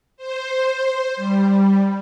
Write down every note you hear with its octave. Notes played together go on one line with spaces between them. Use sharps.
C5
G3